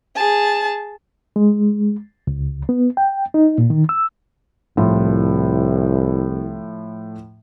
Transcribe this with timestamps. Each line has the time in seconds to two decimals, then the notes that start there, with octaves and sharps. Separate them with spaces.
0.16 G#4 A5
1.36 G#3
2.27 C#2
2.69 B3
2.97 G5
3.34 D#4
3.58 A#2
3.70 D#3
3.89 E6
4.77 C2 A2 F3